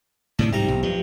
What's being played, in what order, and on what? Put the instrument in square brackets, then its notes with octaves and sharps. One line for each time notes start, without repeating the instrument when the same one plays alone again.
[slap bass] A2 C3 E3 [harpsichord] D4
[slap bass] G#2 G3 [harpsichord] C3 A#5
[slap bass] B1
[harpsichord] G2 [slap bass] F3